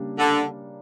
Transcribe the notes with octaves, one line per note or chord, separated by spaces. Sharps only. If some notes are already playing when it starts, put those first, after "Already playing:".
Already playing: C#3 G3 A#3 D4
D3